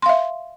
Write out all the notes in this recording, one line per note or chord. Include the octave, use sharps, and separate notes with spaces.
E5 F5 C6